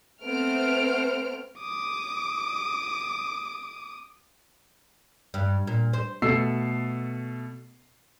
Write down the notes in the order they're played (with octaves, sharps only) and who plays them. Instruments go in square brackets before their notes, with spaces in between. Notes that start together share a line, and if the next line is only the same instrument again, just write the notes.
[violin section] A3 B3 C4 C5 F6 D7
[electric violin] D6 D#6
[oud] G2
A#2
C5
[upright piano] B2 A3 A4 E6 C7